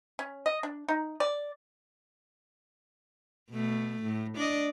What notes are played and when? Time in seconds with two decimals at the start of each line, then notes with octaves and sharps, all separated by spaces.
0.19 C#4
0.46 D#5
0.63 D4
0.88 D#4
1.20 D5
3.51 B2 A3
4.03 A2
4.35 D4 D5 D#5